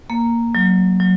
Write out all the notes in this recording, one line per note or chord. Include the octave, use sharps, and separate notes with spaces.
A#3
F#3
F#3